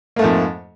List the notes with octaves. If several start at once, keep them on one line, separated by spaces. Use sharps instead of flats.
F2 G#2 A3 A#3